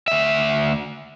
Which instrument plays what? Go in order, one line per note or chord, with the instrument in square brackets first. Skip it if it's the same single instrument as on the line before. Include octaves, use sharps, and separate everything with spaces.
[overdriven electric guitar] D2 E5